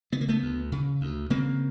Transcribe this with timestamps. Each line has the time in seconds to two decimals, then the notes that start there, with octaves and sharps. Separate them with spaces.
0.12 C#3 B3
0.21 A#3
0.28 A3 B3
0.42 D2
0.72 C#3
1.01 D2
1.30 C#3 A#3 C4